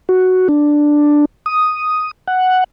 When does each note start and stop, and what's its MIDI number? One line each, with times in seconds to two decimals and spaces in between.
0.09 0.48 66
0.49 1.25 62
1.46 2.11 87
2.28 2.64 78